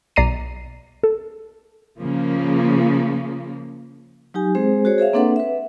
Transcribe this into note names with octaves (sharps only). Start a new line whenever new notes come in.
B1 D5 A#5 C7 D#7
A4
C#3 F3 A#3
F#3 D#4 G4 G#5
G#3 C4 G#4 C5
F#4 G#4 C5 C#5
G#4 C#5 E5 F5
A#3 C4 D4 A4 B4 F#5
B4 E5